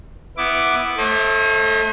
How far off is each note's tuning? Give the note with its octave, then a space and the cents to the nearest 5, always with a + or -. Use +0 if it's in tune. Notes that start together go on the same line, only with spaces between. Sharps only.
B3 +0 E4 +0 D6 +0
A3 +0 C5 +45 D#5 +35